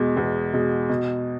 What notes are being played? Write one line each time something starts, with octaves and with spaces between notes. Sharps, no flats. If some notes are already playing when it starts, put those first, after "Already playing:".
Already playing: E2 B2 G#3
E2
B2 G#3
B2